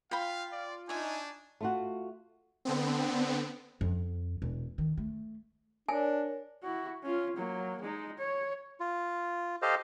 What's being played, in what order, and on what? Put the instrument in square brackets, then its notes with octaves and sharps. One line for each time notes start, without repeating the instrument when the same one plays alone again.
[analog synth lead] F4 [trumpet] F5 [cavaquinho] G5 B5
[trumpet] D5
[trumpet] D4 [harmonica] D#4 G#5 [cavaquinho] C#5 E5
[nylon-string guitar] A3 F4 F#4
[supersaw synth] D3 B3 C4
[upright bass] F2
E1
D#3
A3
[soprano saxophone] D4 [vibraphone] A#4 C#5 [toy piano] G#5
[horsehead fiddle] E4 F#4
C#4 F4
F#3 A#3
G#3 D#4
C#5
[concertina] F4
G4 A4 C5 D#5 F5